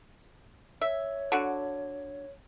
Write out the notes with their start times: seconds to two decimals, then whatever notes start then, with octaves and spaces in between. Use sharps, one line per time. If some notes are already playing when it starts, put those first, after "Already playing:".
0.81 C#5 E5
1.32 D3 F#4